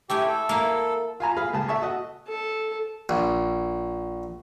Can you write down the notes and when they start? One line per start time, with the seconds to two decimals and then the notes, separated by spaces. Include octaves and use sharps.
0.10 A3 E4 G4 G#5
0.28 A4
0.49 A#3 E4 F5
1.20 F4 G#5 A#5
1.37 G#4 F5 B5
1.53 C#2 G#4 A5
1.68 A4 E5 A5 C#6
1.82 F#4 D#5
2.28 A4
3.09 A#1